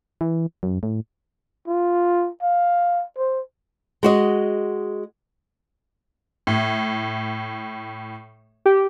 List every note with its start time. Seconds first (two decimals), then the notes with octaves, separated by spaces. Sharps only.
0.21 E3
0.63 F#2
0.83 A2
1.68 F4
2.42 F5
3.18 C5
4.03 G#3 F#4 D#5
6.47 A2
8.66 G4